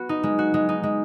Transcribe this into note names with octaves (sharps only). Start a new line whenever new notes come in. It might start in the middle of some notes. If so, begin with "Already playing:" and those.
Already playing: B3 F#4
D#4
G#3
F#4
G#3
D#4
G#3